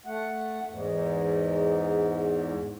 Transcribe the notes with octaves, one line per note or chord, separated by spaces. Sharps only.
A3 F#5
E2 G#2